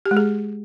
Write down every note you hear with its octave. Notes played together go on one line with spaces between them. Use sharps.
G4
G#3
G#4